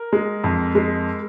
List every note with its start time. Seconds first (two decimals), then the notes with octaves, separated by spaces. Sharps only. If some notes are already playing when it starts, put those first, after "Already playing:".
Already playing: A#4
0.13 G#3
0.44 F2
0.75 G#3